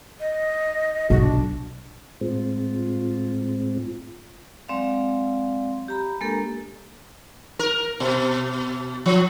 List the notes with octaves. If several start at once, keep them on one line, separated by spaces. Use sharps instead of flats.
D#5
B1 F#4
D4
A2 G#3 C4 F4
F#3 G#3 C4 D5 F5
G4 A#5 B5
G#3 A#3 D4 G4 A4 A#4
A#4
B2
F3